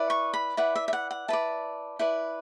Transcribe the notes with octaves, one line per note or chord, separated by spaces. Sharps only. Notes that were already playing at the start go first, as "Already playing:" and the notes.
Already playing: E4 B4 D5
C#6
B5
E4 B4 D5 F#5
E5
E5
F#5
F#5
E4 B4 D5 A5
E4 B4 D5